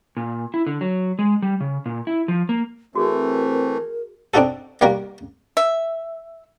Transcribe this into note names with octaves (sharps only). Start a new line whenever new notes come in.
A#2
E4
D3
F#3
G#3
G3
C#3
A#2
E4
F3
A#3
E3 A3 C4 F#4 G#4 A#4
C4 D4 D#4 F#4 A4
D#3 G3 A#3 F#4 A#4
E5